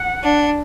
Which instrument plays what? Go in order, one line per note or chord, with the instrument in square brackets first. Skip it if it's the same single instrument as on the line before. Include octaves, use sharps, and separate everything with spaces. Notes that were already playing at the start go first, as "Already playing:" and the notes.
Already playing: [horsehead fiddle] F#5
[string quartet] D4